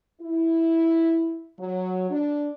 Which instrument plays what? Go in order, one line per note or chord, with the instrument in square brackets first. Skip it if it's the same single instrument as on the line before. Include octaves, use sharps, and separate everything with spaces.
[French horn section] E4
F#3
D4